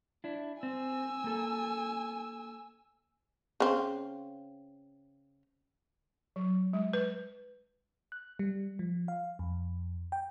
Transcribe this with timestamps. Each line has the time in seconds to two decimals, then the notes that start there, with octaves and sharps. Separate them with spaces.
0.24 D4 E4
0.63 C4 G#5 E6
1.24 A#3 A4
3.60 C#3 C4
6.36 F#3
6.73 G#3
6.93 B4
8.12 F#6
8.39 G3
8.79 F3
9.08 F5
9.39 F2
10.12 G5